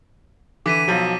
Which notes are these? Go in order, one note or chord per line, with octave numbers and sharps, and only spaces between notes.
D3 E3 D6 B6 D#7
B1 F3 F#3